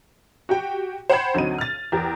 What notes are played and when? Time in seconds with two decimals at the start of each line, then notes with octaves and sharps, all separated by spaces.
0.49 F#4 G4 G5
1.10 C5 F#5 G5 B5 G#6
1.34 D2 F#3 C4 D#4 D#7
1.58 F6 A6
1.92 E2 G4 A#4